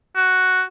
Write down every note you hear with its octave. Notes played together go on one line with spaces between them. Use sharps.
F#4